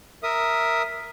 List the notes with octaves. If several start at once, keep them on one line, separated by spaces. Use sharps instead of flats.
A#4 E5 D#6